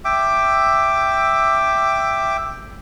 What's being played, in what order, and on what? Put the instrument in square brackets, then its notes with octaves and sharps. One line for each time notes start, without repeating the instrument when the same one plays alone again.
[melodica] E5 G5 D6